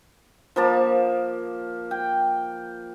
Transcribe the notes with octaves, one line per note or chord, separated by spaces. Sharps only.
F3 A#3 A5
G5